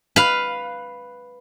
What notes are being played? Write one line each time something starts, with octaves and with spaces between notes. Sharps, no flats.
B4 F5